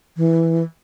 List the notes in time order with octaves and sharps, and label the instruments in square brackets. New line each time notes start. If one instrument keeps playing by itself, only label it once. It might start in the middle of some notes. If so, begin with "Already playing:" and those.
[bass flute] E3